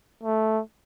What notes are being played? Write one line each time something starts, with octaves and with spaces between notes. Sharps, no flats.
A3